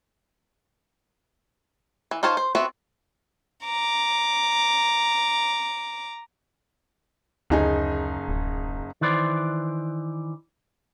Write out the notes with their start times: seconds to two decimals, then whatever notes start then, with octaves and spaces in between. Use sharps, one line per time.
2.11 E3
2.23 D#4 F4 C5 C#5 A5
2.37 C5
2.55 B3 C4 F#4 B4 E5
3.65 A#5 D6
7.50 F#1 D2 D#4 G#4
8.28 D1
9.01 D#3 E3 B4 C5 D5